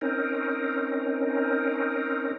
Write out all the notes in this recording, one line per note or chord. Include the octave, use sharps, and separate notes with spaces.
C4 C#4 D#4 A#4